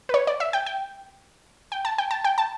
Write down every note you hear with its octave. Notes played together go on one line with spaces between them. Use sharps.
B4
C#5
D5
E5
G5
G5
G5
A5
G5
A5
G5
A5